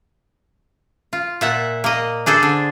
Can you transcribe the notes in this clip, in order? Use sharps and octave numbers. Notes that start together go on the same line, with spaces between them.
F4
A#2 E5 F#5
A#3 D#5
D4 G#4 A4 C5
D3